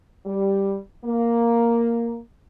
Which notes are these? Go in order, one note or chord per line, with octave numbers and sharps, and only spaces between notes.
G3
A#3